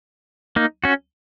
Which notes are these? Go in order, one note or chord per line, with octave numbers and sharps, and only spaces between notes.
A#3 D#4
C#4 F#4